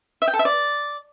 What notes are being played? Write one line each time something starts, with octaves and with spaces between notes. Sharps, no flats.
E5
G5
A4
E5
D5